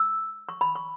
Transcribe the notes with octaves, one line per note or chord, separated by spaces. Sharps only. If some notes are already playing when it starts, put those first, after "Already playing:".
Already playing: E6
C#6
B5
C#6